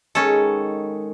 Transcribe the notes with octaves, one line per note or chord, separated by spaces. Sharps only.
D#3 G#3 C#4 A4